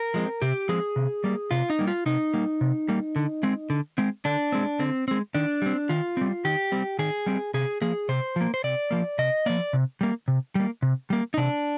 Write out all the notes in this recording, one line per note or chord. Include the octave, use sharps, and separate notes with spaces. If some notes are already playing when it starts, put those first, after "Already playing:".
Already playing: A#4
F3 G#3 C4
C3 G4
F3 G#3 C4 G#4
C3
G3 A#3
C3 F4
D#4
G3 A#3
F4
C3 D#4
G3 A#3
C3
G3 A#3
D3
G#3 C4
D3
G#3 C4
D3 D4
G#3 C4
D3 C4
G#3 C4
D#3 D4
G3 C4
D#3 F4
G3 C4
D#3 G4
G3 C4
D#3 G#4
G3 C4
C3 G#4
F3 A#3 G#4
C3 C5
F3 A#3
C5
C3 D5
F3 A#3
C3 D#5
F3 A#3 D5
C3
G3 A#3
C3
G3 A#3
C3
G3 A#3
D#4
C3 D4